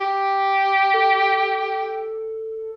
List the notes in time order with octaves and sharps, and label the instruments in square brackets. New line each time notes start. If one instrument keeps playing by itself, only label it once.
[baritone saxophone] G4
[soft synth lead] A4